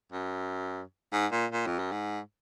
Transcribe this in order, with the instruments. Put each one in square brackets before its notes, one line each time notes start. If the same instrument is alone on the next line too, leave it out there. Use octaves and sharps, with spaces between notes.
[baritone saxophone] F#2
G#2
A#2
A#2
F2
F#2
G#2